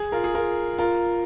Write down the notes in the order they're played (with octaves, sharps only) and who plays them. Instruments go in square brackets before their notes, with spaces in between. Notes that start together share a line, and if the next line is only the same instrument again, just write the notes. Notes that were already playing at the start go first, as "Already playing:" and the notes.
Already playing: [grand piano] G#4
F4 A#4
G#4
F4 A#4
F4 A#4